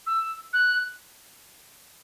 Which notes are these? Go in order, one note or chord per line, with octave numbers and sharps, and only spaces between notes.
E6
F#6